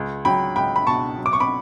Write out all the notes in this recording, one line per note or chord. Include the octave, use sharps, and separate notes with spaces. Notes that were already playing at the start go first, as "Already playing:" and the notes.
Already playing: C#2
F#3 G5 B5
C#2 G5 B5
B5
B2 A5 C#6
F#3
D6
C#6
B5 D6